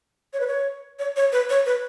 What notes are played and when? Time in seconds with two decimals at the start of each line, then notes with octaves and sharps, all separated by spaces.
0.33 C#5
0.40 B4
0.47 C#5
0.99 C#5
1.16 C#5
1.32 B4
1.50 C#5
1.66 B4